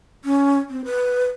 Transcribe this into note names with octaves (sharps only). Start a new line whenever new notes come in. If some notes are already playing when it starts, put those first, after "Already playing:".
C#4
C4
B4